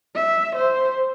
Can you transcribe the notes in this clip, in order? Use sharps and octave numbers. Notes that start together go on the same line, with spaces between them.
E5
C5